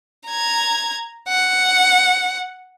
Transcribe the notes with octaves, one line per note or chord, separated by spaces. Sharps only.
A#5 G#6
F#5